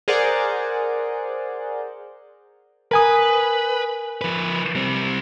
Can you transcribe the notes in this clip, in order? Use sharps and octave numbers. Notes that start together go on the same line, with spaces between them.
G#4 A#4 C5 D5 F#5
A#4 B4 G#5 D#6
F3 B4
G3 C4